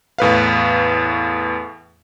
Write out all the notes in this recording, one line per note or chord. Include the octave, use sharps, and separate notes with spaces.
E2 A2 B4 F5